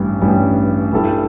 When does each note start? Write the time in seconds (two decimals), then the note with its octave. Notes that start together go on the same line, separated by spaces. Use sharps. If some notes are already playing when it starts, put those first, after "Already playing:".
Already playing: A1 G2 G3
0.21 A1 G2 G3
0.92 G2 G3 E4 A4